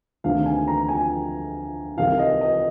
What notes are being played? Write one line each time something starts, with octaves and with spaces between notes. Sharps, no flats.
D2 C3 D#3 F5
G#5
A#5
G#5
C2 C3 D#3 F5
D#5
D#5